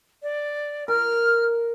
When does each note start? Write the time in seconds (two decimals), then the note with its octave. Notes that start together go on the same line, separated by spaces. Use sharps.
0.23 D5
0.88 A#4 F6